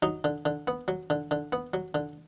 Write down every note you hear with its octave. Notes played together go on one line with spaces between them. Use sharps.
F#3 D#4
D3
D3
B3
F#3
D3
D3
B3
F#3
D3